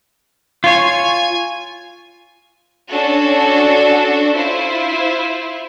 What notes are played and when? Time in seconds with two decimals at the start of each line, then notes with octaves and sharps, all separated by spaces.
0.64 F4 C#5 G#5
2.90 C#4 D4 F#4 A4 A5
4.36 E4 F4 C5